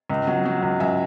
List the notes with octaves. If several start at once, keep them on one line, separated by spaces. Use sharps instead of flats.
C#2
F#3
F#3
C#2
C#2 E5 G#5